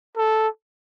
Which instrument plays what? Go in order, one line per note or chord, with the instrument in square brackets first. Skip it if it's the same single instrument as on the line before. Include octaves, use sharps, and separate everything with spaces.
[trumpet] A4